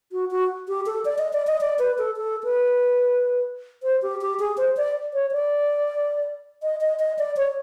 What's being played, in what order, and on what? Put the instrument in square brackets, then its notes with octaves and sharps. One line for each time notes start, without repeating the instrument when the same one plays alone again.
[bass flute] F#4
F#4
G4
A4
D5
D#5
D5
D#5
D5
B4
A4
A4
B4
C5
G4
G4
G#4
C5
D5
C#5
D5
D#5
D#5
D#5
D5
C#5